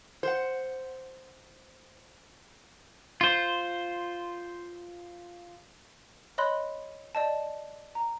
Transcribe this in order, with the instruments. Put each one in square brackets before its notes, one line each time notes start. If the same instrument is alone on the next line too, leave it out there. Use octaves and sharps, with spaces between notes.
[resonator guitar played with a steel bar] C5 F#5
[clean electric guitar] F4 C5
[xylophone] C#5 D#5 B5 C6 F#6
D5 D#5 A5
A#5